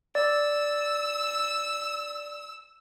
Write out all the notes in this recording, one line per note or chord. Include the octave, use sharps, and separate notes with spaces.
D5 E6